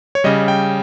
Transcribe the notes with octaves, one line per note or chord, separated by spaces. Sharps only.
C#5
C#3 G3 D#5
G5